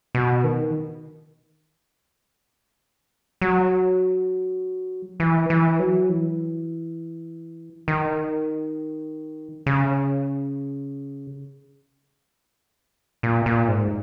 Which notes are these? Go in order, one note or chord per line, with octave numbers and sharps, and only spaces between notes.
B2
D#3
F#3
E3
E3
F#3
E3
D#3
C#3
A#2
A#2
G#2